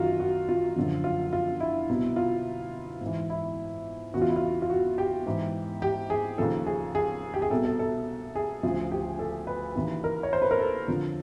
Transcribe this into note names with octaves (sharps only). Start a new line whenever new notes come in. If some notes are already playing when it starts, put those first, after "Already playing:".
Already playing: F#2 D#3 F4 F#4
F#4
F4
F#2 D3 F3
F4
F4
E4
C2 B2
F4
G#2
E3
E4
E2 C#3 E3 F#4
F4
E4
F4
F4
F#4
G4
G#2 E3
G4
G#4
D#2 C#3 F3 A4
G#4
G#4
G4
G#4
C2 B2 A4
A4
A4
G#4
D2 C#3 F3
G4
A4
B4
D#2 C#3 E3
A#4
C#5
C5
B4
A#4
A4
F2 D3 F3